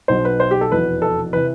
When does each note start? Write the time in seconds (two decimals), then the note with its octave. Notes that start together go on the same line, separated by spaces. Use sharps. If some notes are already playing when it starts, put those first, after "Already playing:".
0.08 B1 B2 C5
0.25 B4
0.40 C5
0.51 G4
0.61 A4
0.71 F1 E2 B2 B4
1.02 A4
1.33 C3 E3 B4